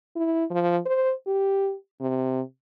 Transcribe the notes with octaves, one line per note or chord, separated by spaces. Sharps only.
E4
F3
C5
G4
C3